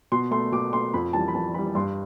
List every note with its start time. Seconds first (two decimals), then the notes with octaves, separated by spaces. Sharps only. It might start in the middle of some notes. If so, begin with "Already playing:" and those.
0.12 B2 C6
0.31 A3 C6
0.52 B2 D6
0.73 A3 C6
0.94 F2 B5
1.13 E3 G3 A5
1.28 B5
1.34 F2 A5
1.54 E3 G3 B5
1.75 G2 C6